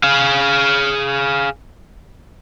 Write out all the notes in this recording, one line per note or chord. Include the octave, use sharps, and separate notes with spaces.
G#4 F5